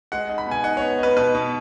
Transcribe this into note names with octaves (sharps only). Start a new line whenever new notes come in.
G#3 F#5
D#4
B5
B2 G#5
D#4 F#5
C#5
B3
D#4 B4
B2 B4
B2